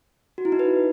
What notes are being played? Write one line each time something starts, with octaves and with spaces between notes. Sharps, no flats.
F#4
E4
D#4
B4